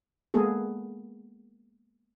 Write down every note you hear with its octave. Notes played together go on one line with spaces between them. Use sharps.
G#3 A#3 B3 G#4 A4